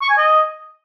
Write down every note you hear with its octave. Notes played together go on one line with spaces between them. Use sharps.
C#6
G#5
D#5